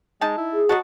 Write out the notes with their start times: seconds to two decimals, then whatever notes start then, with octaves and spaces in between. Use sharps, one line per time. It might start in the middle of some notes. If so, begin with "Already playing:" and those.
0.21 G#3 D#4 A5
0.38 E4
0.53 G#4
0.69 F#3 F#4 D#5 A5